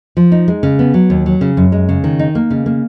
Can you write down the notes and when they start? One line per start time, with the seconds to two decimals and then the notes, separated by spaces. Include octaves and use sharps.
0.17 F3
0.32 D#4
0.48 G#3
0.63 C#3
0.79 B3
0.94 F#3
1.10 D#2
1.26 F#3
1.41 C#3
1.57 F#2
1.72 G#3
1.89 C#3
2.04 D#3
2.19 D#4
2.35 A#3
2.50 C#3
2.66 A#3